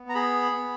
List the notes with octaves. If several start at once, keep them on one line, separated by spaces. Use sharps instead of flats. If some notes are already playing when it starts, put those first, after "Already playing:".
Already playing: B3
A#5
G#4 B5
B3